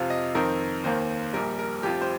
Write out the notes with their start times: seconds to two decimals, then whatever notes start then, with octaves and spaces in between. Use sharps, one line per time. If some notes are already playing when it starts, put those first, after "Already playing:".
Already playing: F2 C3 F3 F5
0.10 D#5
0.35 F2 D#3 C4 D#4 A#4
0.84 D#2 D#3 A#3 C5
1.33 A#1 A#2 G3 A#4
1.59 A#4
1.83 F1 F2 F3 G4
2.02 C5